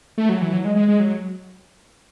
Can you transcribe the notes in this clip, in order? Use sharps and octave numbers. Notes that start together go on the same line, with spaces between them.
A3
F#3
E3
F#3
G#3
G#3
G#3
F#3